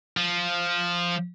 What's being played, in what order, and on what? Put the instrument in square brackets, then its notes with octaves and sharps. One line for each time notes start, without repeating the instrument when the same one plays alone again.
[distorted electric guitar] F3